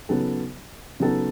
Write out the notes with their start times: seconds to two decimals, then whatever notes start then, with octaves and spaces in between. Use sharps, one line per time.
0.09 C#3 F#3 B3 D#4 A4
1.00 C#3 F#3 B3 D#4 A4